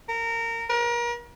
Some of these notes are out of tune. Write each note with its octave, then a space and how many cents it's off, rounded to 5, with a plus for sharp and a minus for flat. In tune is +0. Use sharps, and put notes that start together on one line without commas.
A#4 -20
A#4 +35